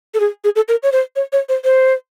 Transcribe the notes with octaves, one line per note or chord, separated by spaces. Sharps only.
A4
G#4
G#4
A4
A#4
C#5
C5
C#5
C#5
C5
C5